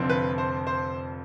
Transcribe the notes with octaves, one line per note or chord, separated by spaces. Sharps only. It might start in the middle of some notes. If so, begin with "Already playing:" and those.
Already playing: F1 F2 D3 F3 C4
B4
C5
C5